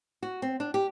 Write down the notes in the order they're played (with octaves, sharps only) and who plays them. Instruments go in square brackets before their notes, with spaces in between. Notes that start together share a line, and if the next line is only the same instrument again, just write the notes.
[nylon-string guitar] F#4
C4
D4
G4